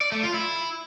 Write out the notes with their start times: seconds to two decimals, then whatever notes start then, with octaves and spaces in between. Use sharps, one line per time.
0.01 D5
0.12 A3
0.23 F4
0.34 E4